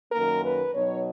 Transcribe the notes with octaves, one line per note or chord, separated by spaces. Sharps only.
F#2 D#3 A#3 A#4
B4
B2 F#3 B3 D#4 C#5